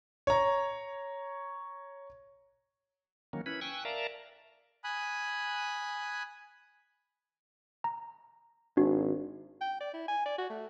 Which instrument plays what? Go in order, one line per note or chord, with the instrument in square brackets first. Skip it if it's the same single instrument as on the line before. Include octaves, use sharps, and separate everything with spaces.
[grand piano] C#5 A#5
[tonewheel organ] D#3 F#3 A#3 C#4
C#4 E4 B4 B5
G5 G#5 C#6 E6 F#6
A#4 D5 E5 F5 A5 A#5
[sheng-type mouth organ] G#5 B5 D#6 F#6
[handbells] A#5
[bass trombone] G#1 [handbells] D4 F#4
[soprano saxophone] G5
D5
E4
G#5
D5
F#4
A3